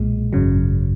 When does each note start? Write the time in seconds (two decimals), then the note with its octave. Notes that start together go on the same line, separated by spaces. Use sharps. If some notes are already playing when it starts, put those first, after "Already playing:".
Already playing: B1 A#2 G#3
0.33 G#1 F#2 C#3 F#3